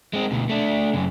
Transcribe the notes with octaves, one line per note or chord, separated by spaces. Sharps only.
G#3 C4
D2 B2
A3 D4
F#2 C#3